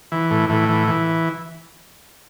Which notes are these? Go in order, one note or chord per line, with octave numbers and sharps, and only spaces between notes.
E3
A2
A2 E3
E3
E3